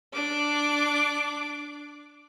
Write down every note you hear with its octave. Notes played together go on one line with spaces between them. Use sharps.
D4 D6